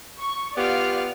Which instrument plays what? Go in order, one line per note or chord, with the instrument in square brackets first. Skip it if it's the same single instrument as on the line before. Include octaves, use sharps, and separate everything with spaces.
[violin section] C#6
[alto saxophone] B3 [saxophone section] F4 G4 [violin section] D5 F5 F6